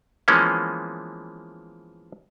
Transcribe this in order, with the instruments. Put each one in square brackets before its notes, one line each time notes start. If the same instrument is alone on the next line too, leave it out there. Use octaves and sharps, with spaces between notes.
[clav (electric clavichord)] E3 F3 G#3 A#3 B3 C#4